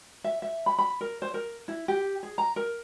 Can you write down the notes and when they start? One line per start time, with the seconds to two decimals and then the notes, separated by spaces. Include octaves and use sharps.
0.24 E5
0.42 E5
0.66 B5
0.78 B5
1.01 A#4
1.22 C5
1.34 A#4
1.68 E4
1.88 G4
2.23 G#4
2.38 A#5
2.56 A#4